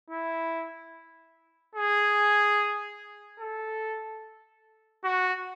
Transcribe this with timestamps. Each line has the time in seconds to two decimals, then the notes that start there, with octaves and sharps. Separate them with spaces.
0.10 E4
1.75 G#4
3.40 A4
5.04 F#4